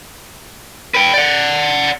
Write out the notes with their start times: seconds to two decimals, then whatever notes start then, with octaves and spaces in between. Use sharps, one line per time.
0.95 B4 G5
1.14 D5 F#5